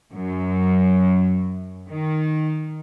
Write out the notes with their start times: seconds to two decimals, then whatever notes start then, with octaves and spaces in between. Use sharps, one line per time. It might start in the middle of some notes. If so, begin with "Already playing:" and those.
0.12 F#2
1.89 D#3